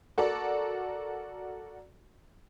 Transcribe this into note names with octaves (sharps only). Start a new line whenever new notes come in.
F#4 A4 A#4 D5